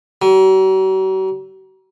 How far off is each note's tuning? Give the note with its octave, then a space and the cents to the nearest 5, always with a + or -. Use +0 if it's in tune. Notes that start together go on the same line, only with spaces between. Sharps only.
F#3 +45